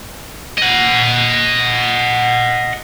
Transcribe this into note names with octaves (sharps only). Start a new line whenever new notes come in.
D#5 F#5